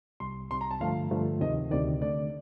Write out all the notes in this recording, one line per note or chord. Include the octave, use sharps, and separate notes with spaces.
C2 C3 G3 C6
C2 C3 G3 C6
A#5
A5
G2 D3 F3 A3 F5
G2 D3 F3 A3
D2 C3 D#3 D#5
D2 C3 D#3 D5
D3 A3 D4 D5